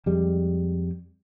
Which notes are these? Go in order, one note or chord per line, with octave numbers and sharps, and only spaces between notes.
F2 G3 G#3